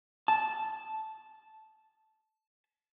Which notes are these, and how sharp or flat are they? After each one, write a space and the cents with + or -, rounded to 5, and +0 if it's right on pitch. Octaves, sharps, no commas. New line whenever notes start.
A5 -10